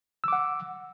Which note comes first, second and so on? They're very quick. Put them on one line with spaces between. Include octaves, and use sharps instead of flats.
E6 D6 F#5